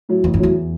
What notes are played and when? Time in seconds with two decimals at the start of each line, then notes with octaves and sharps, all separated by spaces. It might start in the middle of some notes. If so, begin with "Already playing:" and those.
0.09 A2 F#3
0.24 A1 E2
0.34 F#2
0.39 E2 A2 F#3